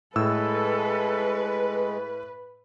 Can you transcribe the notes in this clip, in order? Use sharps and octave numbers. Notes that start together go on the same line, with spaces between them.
A2 G#3 A4 B4 E6